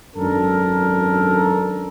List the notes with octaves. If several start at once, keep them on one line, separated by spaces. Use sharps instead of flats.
G#1 F#2 D4 A4 A#4 A#5